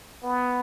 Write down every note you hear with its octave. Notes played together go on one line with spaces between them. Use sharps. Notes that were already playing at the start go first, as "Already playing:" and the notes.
B3